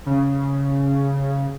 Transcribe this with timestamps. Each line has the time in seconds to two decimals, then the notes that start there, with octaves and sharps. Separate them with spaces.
0.06 C#3